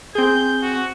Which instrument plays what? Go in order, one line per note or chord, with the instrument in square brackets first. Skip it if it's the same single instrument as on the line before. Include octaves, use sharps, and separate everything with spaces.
[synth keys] C4 G#4 [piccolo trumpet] G6
[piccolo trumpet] F#4